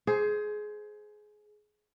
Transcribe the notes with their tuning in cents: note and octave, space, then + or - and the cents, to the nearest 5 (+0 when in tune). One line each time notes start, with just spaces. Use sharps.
G#4 +20 C5 +0